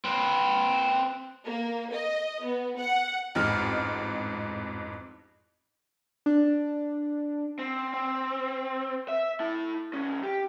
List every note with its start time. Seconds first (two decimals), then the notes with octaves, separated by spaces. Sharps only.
0.05 C4 B4
1.46 A#3
1.93 D#5
2.45 B3
2.79 F#5
3.35 A1 F2 G#2 F6
6.26 D4
7.59 C4
7.94 C4
9.08 E5
9.40 E4 A5
9.93 B1 C#4
10.23 G4